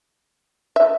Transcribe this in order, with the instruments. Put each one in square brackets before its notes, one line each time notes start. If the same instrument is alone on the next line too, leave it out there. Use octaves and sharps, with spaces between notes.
[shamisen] E5